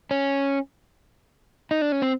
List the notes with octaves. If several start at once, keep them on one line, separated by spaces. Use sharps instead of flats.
C#4
D#4
D4
C#4
C4